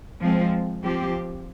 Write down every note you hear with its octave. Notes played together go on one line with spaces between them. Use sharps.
F3 G#3 C4
F3 C4 G4